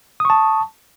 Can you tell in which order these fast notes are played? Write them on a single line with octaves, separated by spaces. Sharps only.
D#6 C#6 A5